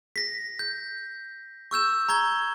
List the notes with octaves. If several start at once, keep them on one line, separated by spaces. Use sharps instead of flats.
A#6 B6
G6
C#6 E6 G6 E7
A#5 C#6 G#6 G7